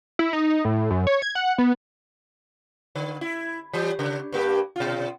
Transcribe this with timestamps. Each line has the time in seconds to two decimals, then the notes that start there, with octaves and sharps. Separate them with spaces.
0.19 E4
0.33 D#4
0.65 A2
0.90 F#2
1.07 C#5
1.22 G#6
1.35 F#5
1.58 B3
2.95 D3
3.21 E4
3.73 E3 G3
3.99 C#3
4.32 G2 A#3 G4
4.76 B2 F4